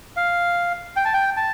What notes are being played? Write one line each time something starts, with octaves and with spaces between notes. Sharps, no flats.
F5
G5
A5
G5
A5